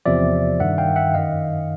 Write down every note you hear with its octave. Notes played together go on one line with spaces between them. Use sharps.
E2 C3 F3 D5 E5
G2 D#3 E5 F#5
F5 G5
E5 F#5
F#2 D#3 D#5 F5